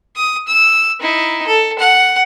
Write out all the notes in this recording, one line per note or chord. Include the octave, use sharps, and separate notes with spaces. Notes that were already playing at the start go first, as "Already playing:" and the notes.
D#6
E6
D#4 E4
A4
F#5